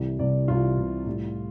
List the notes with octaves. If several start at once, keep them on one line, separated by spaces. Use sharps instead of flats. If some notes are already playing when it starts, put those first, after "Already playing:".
Already playing: C2 C3 E3 G3
C2 C3 E3 G3 D5
C2 C3 E3 G3 F4
C2 C3 E3 G3
A2 G3